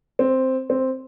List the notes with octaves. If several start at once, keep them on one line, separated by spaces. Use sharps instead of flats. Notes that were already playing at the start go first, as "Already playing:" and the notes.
C4
C4